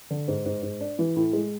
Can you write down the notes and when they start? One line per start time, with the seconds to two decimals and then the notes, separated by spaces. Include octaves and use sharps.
0.10 D3
0.28 G#2
0.46 G#2
0.62 G#2
0.81 D4
0.99 E3
1.16 A2
1.33 G#3